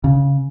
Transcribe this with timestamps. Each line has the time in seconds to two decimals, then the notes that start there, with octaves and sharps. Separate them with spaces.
0.04 C#3